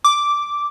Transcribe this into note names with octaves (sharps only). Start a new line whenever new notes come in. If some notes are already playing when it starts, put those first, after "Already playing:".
D6